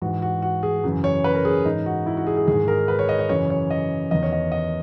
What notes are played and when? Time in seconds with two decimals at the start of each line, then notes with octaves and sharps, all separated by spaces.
0.02 G#2 E3 F#4
0.22 F#4
0.42 F#4
0.63 G#4
0.83 F#2 C#3 E3
1.04 C#5
1.24 B4
1.35 A#4
1.45 G#4
1.65 G#2 E3 D#4
1.86 F#4
2.06 E4
2.17 F#4
2.27 G#4
2.37 G#4
2.48 G#2 D#3 G#4
2.68 A#4
2.88 B4
2.99 C#5
3.09 D#5
3.19 C#5
3.29 F#2 C#3 E3 C#5
3.50 C#5
3.70 D#5
4.11 E2 D#3 D#5
4.23 C#5
4.32 D#5
4.52 D#5